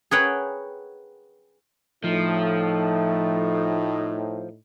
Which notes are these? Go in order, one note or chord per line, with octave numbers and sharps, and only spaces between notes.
G#4 A#4 B4 C#5 F#5 G5
A2 F3 A3 D#4